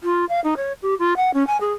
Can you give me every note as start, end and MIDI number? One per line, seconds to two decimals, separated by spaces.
0.03 0.25 65
0.29 0.40 77
0.44 0.54 63
0.57 0.72 73
0.82 0.94 67
0.99 1.16 65
1.16 1.31 78
1.34 1.46 61
1.47 1.57 80
1.61 1.71 68